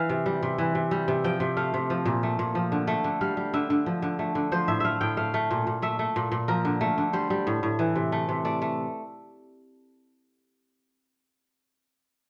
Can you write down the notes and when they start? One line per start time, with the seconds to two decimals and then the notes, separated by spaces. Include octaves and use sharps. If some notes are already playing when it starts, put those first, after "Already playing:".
Already playing: E3 F5
0.09 C3
0.26 G3
0.43 C3
0.58 E3
0.75 C3
0.91 G3
1.08 C3
1.24 F3 G5
1.40 C3
1.57 A3 F5
1.74 C3
1.90 F3
2.06 A#2
2.23 A3
2.39 A#2
2.55 F3
2.72 D3
2.87 A3
3.04 D3
3.21 G3 F5
3.37 G3
3.54 D3 E5
3.70 D3
3.86 F3
4.02 D3
4.19 A3
4.35 D3
4.52 F3 C5
4.68 A2 E5
4.80 A3 E5 F5
5.01 A2 G5
5.17 A3 F5
5.34 A3
5.51 A#2
5.67 A#2
5.82 A3 E5
5.99 A3
6.16 A#2
6.32 A#2
6.48 F3 A#4
6.65 D3
6.81 A3
6.98 D3
7.13 G3 C5
7.30 G3
7.47 A2
7.63 A2
7.79 E3
7.96 C3
8.12 A3
8.29 C3
8.45 A3 D5
8.62 A3